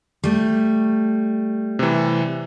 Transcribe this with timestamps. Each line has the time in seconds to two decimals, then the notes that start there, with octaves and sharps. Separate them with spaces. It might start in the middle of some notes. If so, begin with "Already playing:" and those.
0.24 G3 A3
1.79 C3 E3